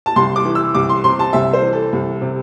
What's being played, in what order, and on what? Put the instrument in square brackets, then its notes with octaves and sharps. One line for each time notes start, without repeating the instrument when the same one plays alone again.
[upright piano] A5
C2 C6
D6
E3
E6
C2 D6
C6
C3 C6
A5
C2 E5
C5
E3
A4
C2
C3